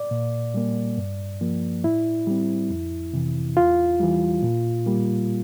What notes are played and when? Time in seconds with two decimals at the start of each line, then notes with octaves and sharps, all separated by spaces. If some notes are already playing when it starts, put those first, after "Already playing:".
Already playing: D5
0.11 A#2
0.54 G3 A#3
0.98 G2
1.41 F3 A#3
1.84 A2 E4
2.27 G3 C4
2.70 F2
3.14 C3 E3
3.57 E2 F4
4.00 E3 G3
4.43 A#2
4.86 G3 A#3